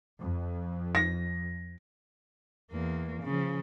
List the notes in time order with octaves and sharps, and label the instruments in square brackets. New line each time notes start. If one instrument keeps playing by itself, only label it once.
[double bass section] F2
[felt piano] A#6
[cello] E2 A#3
C#3 F3